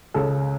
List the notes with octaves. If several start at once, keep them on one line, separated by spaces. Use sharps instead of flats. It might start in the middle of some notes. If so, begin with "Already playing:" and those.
C#2 C#3 G#3 A4